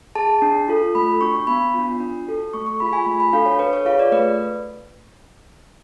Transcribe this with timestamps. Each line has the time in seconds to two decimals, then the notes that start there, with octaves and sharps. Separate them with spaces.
0.15 G#4 A5
0.42 D4
0.68 F4 A4
0.95 A3 B5
1.21 D4 F#4 C#6
1.47 B3 B5
1.74 D4 F4
2.00 D4
2.27 F#4 A4
2.53 A3 C#6
2.66 C#6
2.80 F4 G#4 B5
2.93 G#5
3.06 A3 B5
3.20 B5
3.33 D4 F#4 A4 F5
3.46 C#5
3.59 D4 B4
3.73 C#5
3.85 F4 G#4 F5
3.99 D5
4.12 A3 B4